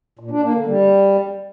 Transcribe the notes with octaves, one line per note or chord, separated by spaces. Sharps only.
A#2
D4
A#3
D3
G3